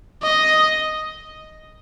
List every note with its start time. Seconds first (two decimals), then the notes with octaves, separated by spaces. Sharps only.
0.23 D#5